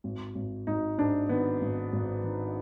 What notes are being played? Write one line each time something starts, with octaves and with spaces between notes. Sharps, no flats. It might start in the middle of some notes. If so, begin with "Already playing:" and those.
G#1
G#1
G#1 D#4
G#2 D4
D#3 B3
G#1
G#1
D#3